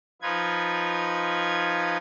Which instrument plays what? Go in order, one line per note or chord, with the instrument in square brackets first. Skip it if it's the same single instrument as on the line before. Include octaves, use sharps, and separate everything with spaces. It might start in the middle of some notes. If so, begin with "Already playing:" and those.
[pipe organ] F3 D#4 F4 B4 G#6